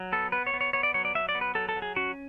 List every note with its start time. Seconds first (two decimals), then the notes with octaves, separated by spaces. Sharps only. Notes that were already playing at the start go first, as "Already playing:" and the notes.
Already playing: F#3
0.12 B3 A4
0.32 B3 B4
0.47 C#5
0.54 B3
0.61 C#5
0.73 B3 C#5
0.83 D5
0.94 F#3 C#5
1.05 D5
1.15 F#3 E5
1.29 D5
1.35 B3
1.41 B4
1.55 F#3 A4
1.69 A4
1.76 F#3
1.82 G#4
1.96 C#4 F#4